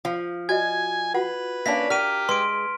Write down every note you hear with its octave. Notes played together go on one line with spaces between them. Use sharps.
F3 F5
F#4 D5 D#5 G#5 G#6
F4 F#4 B4 F#5
A#3 C#4 D4 E5 F5 B6
G4 A#4 F6 B6 D#7
G#3 B4 C6 D7